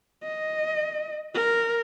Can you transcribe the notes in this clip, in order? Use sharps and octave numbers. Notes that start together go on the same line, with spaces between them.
D#5
A#4